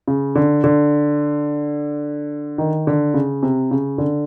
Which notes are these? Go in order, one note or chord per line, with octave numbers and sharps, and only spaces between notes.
C#3
D3
D3
D#3
D3
C#3
C3
C#3
D3